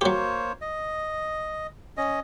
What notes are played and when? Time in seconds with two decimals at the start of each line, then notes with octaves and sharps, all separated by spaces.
0.01 F#3 A#3 G4 C5 C#5
0.61 D#5
1.97 C#4 D#5